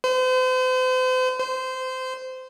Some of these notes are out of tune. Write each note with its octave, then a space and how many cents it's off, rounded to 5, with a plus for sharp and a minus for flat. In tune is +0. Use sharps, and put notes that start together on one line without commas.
C5 -40
C5 -20